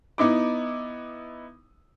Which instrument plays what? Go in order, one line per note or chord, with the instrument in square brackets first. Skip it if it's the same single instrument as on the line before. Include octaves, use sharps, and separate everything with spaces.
[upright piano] B3 D#4 E4 D6